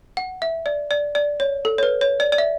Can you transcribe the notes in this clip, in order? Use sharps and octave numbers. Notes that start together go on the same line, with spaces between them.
F#5
E5
D5
D5
D5
C#5
A4
C#5
B4
C#5
D5
D5
E5